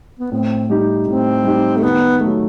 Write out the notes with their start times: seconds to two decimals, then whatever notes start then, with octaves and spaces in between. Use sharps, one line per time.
0.19 B3
0.31 A2 C4
0.69 G3 D#4 G4
1.07 A2 C4
1.44 G3 D#4 G4
1.77 A3
1.83 D#3 B3
2.21 F#3 A3